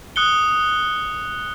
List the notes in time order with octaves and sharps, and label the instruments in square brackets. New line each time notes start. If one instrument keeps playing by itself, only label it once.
[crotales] D#6 F#6 C#7 G7